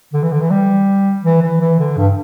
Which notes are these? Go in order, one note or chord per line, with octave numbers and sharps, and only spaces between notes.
D3
E3
D3
E3
G3
E3
E3
E3
D3
G2